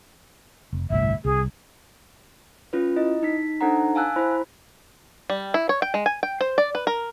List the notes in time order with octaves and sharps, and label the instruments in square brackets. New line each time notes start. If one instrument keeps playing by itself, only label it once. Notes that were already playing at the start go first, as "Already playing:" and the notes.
[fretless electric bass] F1
[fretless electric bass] G1 C2 A2 [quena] E5
[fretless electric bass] C2 [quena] G#4
[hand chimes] C#4 F4 B4
E4 D#5
D#4 B6
D4 D#4 A4 C5 F#5 A#5
F5 G#5 A5 E6 F#6
E4 C5 B5
[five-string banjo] G3
E4
C#5
G5
G#3
G#5
G5
C5
D5
B4
A#4